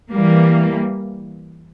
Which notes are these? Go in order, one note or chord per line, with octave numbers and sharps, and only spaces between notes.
E3 G3 A#3